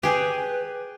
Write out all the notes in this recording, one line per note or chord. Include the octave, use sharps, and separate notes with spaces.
G4 G#4 B4